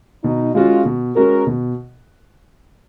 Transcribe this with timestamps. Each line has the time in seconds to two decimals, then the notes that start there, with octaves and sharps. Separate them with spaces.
0.24 B2 D#4
0.55 G#3 C#4 F4 F#4
0.85 B2
1.16 G#3 C#4 F#4 A#4
1.47 B2